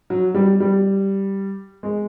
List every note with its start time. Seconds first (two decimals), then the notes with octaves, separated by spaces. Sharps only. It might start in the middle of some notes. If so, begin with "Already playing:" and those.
0.10 F#3
0.35 G3
0.60 G3
1.83 G#3